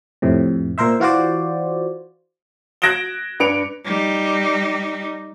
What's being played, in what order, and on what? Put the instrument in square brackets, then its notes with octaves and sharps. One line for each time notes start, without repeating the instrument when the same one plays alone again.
[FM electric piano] F2 A2 C3
A#2 A#4 C5 E5
E3 F4 F#4 C5 D5
[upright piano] F#6 G#6 A#6 D7 E7 G7
G2 D4 B4 C#7 D7 F7
[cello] G3 D#4